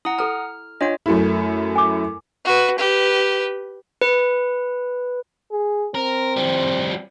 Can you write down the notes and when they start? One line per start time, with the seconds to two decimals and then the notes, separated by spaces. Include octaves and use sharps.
0.05 E4 F#5 A#5 D#6
0.18 A4 A#5 F6
0.81 D4 F4 C#5 D#5 F#5
1.06 F#2 A3 E4
1.76 G#5 D6
2.45 F#4 B4
2.78 G4 B4
4.02 B4
5.51 G#4
5.95 C4 A#4
6.37 F3 G3